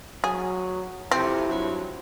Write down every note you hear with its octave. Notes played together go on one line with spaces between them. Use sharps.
F#3 G#4
F2 C3 C4 E4
G2 F3 F#3